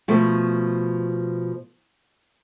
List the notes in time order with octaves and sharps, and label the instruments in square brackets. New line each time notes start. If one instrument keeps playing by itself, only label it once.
[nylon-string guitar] B2 F3 A3